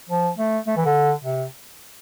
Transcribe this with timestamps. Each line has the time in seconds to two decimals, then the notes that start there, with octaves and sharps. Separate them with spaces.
0.09 F3
0.38 A3
0.67 A3
0.77 E3
0.85 D3
1.24 C3